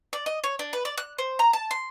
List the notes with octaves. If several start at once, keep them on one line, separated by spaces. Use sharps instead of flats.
D5
D#5
C#5
D4
B4
D5
F#6
C5
A#5
A5
C6